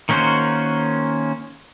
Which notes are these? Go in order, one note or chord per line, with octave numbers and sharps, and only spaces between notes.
D#3 A#3 C#4 F#4 C5